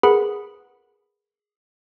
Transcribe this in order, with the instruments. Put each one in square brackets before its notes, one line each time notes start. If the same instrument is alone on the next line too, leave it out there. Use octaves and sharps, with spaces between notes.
[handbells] G#4 A#4 B4 F#5 B5